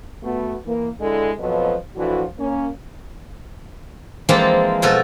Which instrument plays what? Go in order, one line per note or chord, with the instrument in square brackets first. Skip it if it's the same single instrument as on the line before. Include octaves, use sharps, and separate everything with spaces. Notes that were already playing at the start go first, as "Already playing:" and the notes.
[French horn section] A3 B3 F#4
E3 A#3
D3 G#3 E4 A4
F2 B2 F3 F#3 B4 D#5
A2 E3 F3 D4 F#4
A#3 C#4
[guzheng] E3 F3 G#3 A#3 C4 D5
B2 F3 F#4 A4